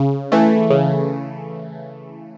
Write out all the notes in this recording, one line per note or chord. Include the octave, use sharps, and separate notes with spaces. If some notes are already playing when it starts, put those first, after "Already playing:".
Already playing: C#3
E3 A3
C#3